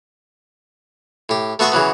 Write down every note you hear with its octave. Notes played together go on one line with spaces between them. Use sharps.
A2 G4
A3 B3 F#4 C6 C#6 D#6
C#3 E3 F#3 B3